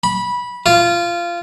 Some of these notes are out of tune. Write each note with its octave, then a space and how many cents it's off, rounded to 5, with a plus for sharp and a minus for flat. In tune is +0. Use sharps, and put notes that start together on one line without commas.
B5 -15
F4 -15